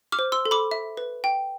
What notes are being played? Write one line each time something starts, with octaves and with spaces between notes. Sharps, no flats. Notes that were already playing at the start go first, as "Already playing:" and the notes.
D6 F6
C5
C6 E6
A4
B5 D6
E5
B4
G5